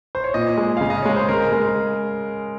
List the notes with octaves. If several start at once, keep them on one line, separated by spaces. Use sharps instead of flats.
C5
C#5
A#2 D#5
G#3
C#3 F5
D#5
G#3 C#5
C5
C#3 A#4
G#3